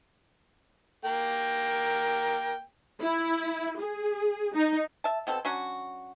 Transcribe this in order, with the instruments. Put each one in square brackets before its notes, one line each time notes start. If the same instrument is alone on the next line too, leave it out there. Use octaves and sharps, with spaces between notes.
[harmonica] A#3 A#4 G5
[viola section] E4
G#4
D#4
[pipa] E5 A5
B2 C4 A4
F#3 C#4 D4 F#4